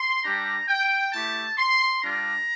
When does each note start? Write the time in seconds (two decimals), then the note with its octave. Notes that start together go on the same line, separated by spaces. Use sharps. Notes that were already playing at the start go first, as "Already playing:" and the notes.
Already playing: C6
0.24 G3 D4 G4 A#5
0.68 G5
1.13 A3 E4 G4 A5
1.58 C6
2.02 G3 D4 F4 A#5